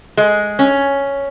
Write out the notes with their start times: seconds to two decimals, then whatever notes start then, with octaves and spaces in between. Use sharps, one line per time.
0.17 G#3
0.59 C#4